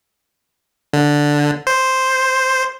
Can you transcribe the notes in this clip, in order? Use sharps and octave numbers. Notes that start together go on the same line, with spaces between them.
D3
C5